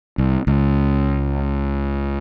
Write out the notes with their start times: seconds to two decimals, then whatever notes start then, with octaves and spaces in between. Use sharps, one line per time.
0.18 C2
0.47 C#2